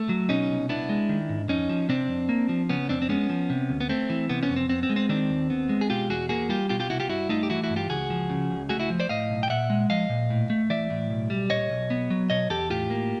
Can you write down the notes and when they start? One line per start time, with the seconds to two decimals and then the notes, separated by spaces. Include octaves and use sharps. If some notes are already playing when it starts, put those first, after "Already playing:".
Already playing: A3
0.09 F#3
0.29 B2 C#4 D#4
0.49 C2
0.69 B3 D4 E4
0.89 G#3
1.09 D#3
1.29 G#2
1.49 F2 C#4 D#4
1.69 F3
1.89 C3 C4 D4
2.09 F2
2.29 A#3
2.49 F3
2.69 C#3 B3 C#4
2.89 F2 C4 D4
3.02 C4
3.09 G#3 B3 C#4
3.30 F3
3.50 C3
3.70 D2
3.81 B3
3.89 A3 C4
4.10 E3
4.29 C3 B3
4.43 B3 C#4
4.49 F2
4.56 C4
4.69 B3 C4
4.83 C4
4.90 G#3
4.96 C4
5.09 D#3 C4 D4
5.29 D#2
5.50 B3
5.69 G#3
5.81 G#4
5.90 B2 F4 G4
6.10 E2 F#4 G#4
6.29 A#3 F#4 G#4
6.49 G3 F4 G4
6.69 B2 F4 G4
6.80 F4 G4
6.90 C2 E4 F#4
7.00 F4 G4
7.09 G2 E4 F#4
7.29 A3 D#4 F4
7.43 G4
7.50 E3 E4 F#4
7.63 E4 F#4
7.70 G2
7.76 F4 G4
7.90 C#2 F#4 G#4
8.10 F3
8.30 C#3
8.50 C#2
8.69 A3 F#4 G#4
8.80 E4 F#4
8.90 F3
9.00 C5 D5
9.09 A2 D#5 F5
9.30 B1
9.43 G5
9.49 A#2 E5 F#5
9.70 G#3
9.90 F3 D#5 F5
10.09 A#2
10.30 A2
10.50 A3
10.70 E3 D5 E5
10.90 A2
11.10 B1
11.30 G3
11.50 A#2 C#5 D#5
11.70 B1
11.90 B3
12.10 F#3
12.30 B2 C#5 D#5
12.50 E2 G4 A4
12.70 A2 F4 G4
12.90 A#3